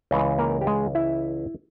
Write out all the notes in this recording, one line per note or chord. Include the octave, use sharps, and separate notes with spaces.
C#2 C#3 E3 G#3
A#3 A#4
G4
G#3 G#4
E4 E5